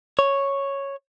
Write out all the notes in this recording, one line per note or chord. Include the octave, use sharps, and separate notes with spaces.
C#5